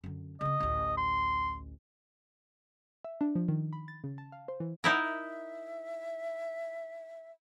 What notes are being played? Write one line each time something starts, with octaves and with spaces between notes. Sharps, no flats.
F#2 D3
C#3 C4 D#5
A1 D2
C6
E5
D4
F3
D#3
B5
A6
C#3
A5
F5
C5
E3
D#4 E4 A#4 F#5
E5